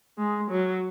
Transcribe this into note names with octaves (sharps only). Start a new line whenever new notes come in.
G#3
F#3